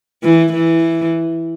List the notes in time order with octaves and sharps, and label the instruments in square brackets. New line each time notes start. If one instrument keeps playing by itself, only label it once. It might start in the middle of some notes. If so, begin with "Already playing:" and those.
[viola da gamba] E3
E3